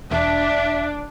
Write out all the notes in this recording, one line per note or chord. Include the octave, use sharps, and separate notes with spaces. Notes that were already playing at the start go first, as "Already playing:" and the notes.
E1 D4 E5